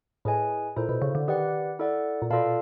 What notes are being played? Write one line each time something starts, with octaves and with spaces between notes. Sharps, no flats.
A2 E4 G#4 B4 D#5 G#5
A#2 E4 A4 C5
B2
C#3
D3
D#3 G4 B4 D5 F#5
E4 A4 D5 F#5
A#2
B2 F4 A4 D5 F5 A5